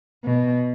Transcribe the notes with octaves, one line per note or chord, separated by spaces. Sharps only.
B2